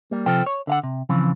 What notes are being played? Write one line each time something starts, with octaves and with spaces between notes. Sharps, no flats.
G3 A#3
C3 F3 F4 A4 C5 G5
C#5
D3 F5 F#5
C3
C#3 E3 F3 C4